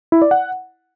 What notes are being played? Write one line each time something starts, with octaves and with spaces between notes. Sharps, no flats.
E4
D5
F#5